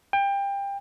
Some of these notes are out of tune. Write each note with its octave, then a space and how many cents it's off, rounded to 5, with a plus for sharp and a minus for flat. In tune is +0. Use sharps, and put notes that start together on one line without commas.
G5 +25